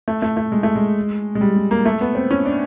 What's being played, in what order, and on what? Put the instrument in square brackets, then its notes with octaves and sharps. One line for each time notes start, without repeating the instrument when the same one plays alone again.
[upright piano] A3
A3
A3
G#3
A3
G#3
G#3
G3
G#3
A#3
A3
B3
C4
C#4
D4